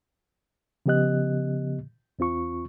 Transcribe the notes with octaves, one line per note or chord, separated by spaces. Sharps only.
C#3 F3 B3 G4 D#5 F#6
E2 C4 F4 C#6